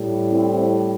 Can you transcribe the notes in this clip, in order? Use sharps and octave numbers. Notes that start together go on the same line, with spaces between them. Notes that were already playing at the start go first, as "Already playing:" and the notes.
Already playing: A2 G3
C4 E4